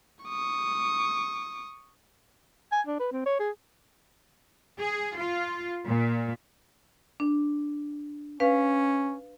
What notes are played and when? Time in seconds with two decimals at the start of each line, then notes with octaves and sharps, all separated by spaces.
0.25 C#6 D#6
2.72 G#5
2.87 D4
2.99 B4
3.12 C4
3.26 C#5
3.39 G#4
4.80 G#4
5.18 F4
5.87 A#2
7.20 D4
8.40 C#4 B4 F5